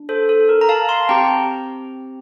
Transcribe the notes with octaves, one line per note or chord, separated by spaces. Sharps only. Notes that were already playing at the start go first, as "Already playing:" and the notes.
Already playing: D4
A4 C5
A4
A#4
A#5
F5 A5
A5 C6
C4 G4 G5 A#5